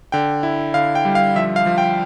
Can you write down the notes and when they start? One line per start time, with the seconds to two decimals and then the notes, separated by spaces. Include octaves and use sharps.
0.12 D3 G5
0.43 E4
0.74 D3 F5
0.95 G5
1.05 G3
1.15 F5
1.36 F3 E5
1.56 F5
1.66 F3
1.78 G5